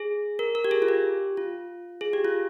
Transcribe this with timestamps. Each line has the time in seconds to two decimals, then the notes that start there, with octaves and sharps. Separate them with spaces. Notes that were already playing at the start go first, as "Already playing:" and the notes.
Already playing: G#4
0.39 A#4
0.55 A#4
0.65 G4
0.71 G#4
0.82 F4
0.88 G4
1.37 F4
2.01 G#4
2.13 G4
2.25 F4